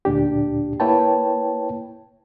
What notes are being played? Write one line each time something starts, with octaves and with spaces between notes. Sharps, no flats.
D2 A#2 D4 G4
A#3 E4 B4 C#5 G5 A5